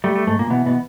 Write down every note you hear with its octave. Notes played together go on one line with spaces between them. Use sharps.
G3 A3
A3
G#2 A3
A#2 A#3
B2 E3 B3
B2 B3